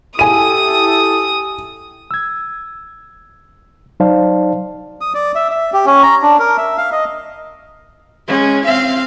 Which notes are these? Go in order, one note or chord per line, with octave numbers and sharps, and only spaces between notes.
E4 G4 A4 G#5 D#6 D#7
E6 G#6
F#3 D#4 C5 D5 F5 A5
D#6
D5
E5
E5
G4
C#4
A#5
D4
A#4
E5
F5
D#5
G#3 C#4
C4 F5